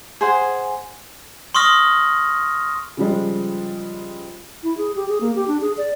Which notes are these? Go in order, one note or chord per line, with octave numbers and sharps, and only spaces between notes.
G#4 C5 F#5 G#5
C6 C#6 D#6 F6 A#6
C#3 F3 G3 G#3
E4
G#4
G4
G#4
A#3
G4
D4
G#4
D5